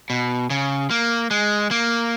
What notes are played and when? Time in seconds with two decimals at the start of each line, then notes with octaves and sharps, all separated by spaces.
0.10 B2
0.50 C#3
0.91 A#3
1.31 G#3
1.71 A#3